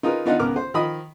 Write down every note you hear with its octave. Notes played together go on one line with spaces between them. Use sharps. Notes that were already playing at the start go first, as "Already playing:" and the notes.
D#4 F4 G#4 A#4 B4
B3 D4 D#4 F4 D#5 F#5
C#2 B3 A#4 D6 F6
C5
D#3 F3 D#5 B5 D#6